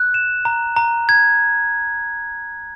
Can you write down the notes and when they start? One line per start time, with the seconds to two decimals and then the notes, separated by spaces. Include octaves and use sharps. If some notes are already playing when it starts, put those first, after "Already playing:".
Already playing: F#6
0.14 E7
0.45 A#5
0.76 A#5
1.09 G#6